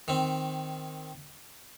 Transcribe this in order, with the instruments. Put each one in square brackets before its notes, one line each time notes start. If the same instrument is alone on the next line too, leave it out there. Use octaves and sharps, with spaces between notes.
[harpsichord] D#3 C4